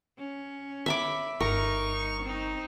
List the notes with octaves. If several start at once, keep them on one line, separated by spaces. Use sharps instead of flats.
C#4
E5 B5 D6
G1 D#4 A#4 C#6
C4 D#4